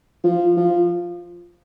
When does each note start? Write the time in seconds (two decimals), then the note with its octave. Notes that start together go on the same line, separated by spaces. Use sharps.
0.24 F3
0.57 F3